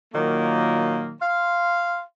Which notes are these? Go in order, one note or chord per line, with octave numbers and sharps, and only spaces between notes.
A#2 D#3 F#3 A#3
F5 C6